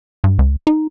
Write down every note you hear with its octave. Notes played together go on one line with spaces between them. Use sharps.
G2
C#2
D#4